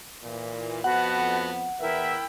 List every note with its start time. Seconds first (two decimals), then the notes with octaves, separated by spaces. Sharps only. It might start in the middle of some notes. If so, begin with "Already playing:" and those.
0.24 A#2 E3
0.84 F2 B3 F#4 F#5 A5 B5
1.80 E2 E4 A#4 B4 E5 G5